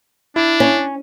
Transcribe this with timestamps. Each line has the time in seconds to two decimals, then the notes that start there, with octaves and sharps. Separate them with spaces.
0.36 D4 E4
0.60 C#4